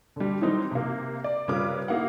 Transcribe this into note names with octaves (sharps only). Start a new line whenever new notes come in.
D3 G3
D#3 E3 F#3 G3 C4 D#4
C3 A#3
D5
C#3 G3 F4 A#4 B4 D6
A#3 D#4 E4 F5 F#5